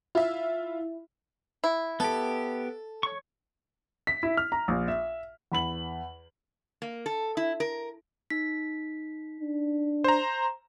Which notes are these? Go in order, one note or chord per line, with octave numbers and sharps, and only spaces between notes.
E4 F4 E5
E4
B3 G4 A4
C#5 C#6
B6
E4
F6
A#5
A#1
E5
E2 B5 F#7
A#3
A4
E4
A#4
D#4 B6
D4
C5 A#5